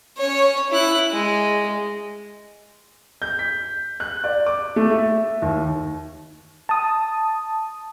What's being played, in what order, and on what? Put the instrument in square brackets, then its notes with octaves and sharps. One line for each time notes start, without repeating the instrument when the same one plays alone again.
[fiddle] C#4 C#5
E4 F#6
G#3
[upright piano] G6
B6
F#6
D5
D6
A3
E5
D#2
[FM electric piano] A5 D#6